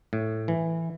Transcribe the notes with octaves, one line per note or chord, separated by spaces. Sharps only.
A2
E3